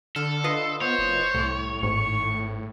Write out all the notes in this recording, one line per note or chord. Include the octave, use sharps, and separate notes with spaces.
D3 A4 F6
F4 B4 D#5 C6
B3 C5 C#5
F#1
C2 A2
G#1 G#2 C#6